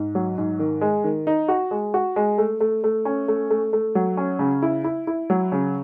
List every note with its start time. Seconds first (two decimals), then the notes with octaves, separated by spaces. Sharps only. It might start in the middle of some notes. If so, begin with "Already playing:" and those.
Already playing: G#2
0.15 F#3
0.38 G#2
0.59 D#3
0.81 G#3
1.04 D#3
1.27 D#4
1.48 F#4
1.71 G#3
1.94 F#4
2.16 G#3
2.38 A3
2.60 A3
2.84 A3
3.05 C#4
3.28 A3
3.50 A3
3.73 A3
3.95 F#3
4.17 C#4
4.39 C#3
4.62 E4
4.84 E4
5.07 E4
5.30 F#3
5.52 C#3